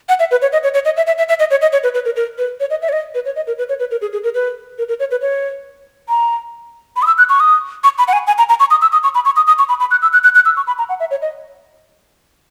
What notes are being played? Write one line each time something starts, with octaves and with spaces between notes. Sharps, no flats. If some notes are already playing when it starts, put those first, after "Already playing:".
F#5
E5
B4
C#5
D#5
C#5
C#5
D#5
E5
E5
E5
E5
D#5
C#5
D#5
C#5
B4
B4
A#4
A#4
B4
C#5
D#5
E5
C#5
D#5
B4
C#5
D#5
A#4
B4
C#5
B4
A#4
G#4
G#4
A#4
B4
A#4
A#4
C#5
B4
C#5
A#5
B5
D#6
E6
F#6
C#6
D#6
C#6
B5
F#5
G#5
G#5
A#5
A#5
C#6
D#6
E6
D#6
C#6
B5
C#6
D#6
D#6
C#6
B5
B5
F#6
E6
F#6
F#6
F#6
E6
C#6
B5
A#5
F#5
E5
C#5
D#5